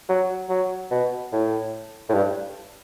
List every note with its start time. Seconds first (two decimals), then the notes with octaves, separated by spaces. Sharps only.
0.09 F#3
0.49 F#3
0.91 B2
1.32 A2
2.09 A2
2.14 G2